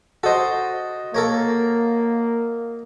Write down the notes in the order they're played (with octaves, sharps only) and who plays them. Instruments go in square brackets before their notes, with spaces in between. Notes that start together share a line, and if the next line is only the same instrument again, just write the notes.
[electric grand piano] F#4 D#5 [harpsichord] A4 C5
[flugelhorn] A#3 [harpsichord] A4 A#4 C#5